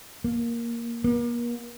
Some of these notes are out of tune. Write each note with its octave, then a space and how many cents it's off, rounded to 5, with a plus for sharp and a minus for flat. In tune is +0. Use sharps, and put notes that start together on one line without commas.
A#3 +5
A#3 +40